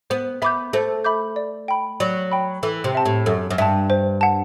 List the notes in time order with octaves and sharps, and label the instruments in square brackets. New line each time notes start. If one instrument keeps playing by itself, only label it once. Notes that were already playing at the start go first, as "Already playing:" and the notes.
[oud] B3 [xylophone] C5
[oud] B3 [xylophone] E5 B5 D6 G6
[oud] A3 [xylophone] C5
[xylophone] E5 B5 D6 G6
D5
G5 B5
[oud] F#3 [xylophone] D5
[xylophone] G5 B5
[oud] E3 [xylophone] A4
[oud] C3
[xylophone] E5 A5
[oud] A2
[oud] F#2 [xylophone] A4
[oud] F#2
[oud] G2 [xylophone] E5 A5
[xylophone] C5
F#5 A5